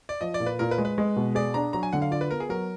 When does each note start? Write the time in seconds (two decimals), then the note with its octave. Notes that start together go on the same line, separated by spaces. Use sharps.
0.09 D5
0.21 F3 D#5
0.34 D5
0.40 A#2
0.46 B4
0.59 A#2 A#4
0.71 B4
0.78 G#3
0.85 B4
0.98 G#3
1.17 B2
1.35 G#4 D5
1.54 D4 A#5
1.73 F#3 A#5
1.83 G#5
1.93 D3 F#5
2.02 F5
2.11 F4 D5
2.21 B4
2.31 B3 A#4
2.40 G#4
2.49 F#3 A#4